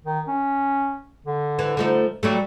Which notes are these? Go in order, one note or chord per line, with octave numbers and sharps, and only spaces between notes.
D#3
C#4
D3
E3
F3 A3 D#4
F#3 G3 A3